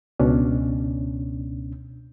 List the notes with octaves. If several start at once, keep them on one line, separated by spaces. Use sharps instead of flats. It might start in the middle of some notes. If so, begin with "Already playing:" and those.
C#2 B2 C#4 D4